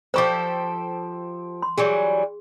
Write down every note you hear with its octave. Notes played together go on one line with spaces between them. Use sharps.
F3 G4 A4 C5 C#6 D6
C6
E3 F#3 G3 G#4